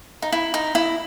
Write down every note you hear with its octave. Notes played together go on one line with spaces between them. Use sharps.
D#4
E4
D#4
E4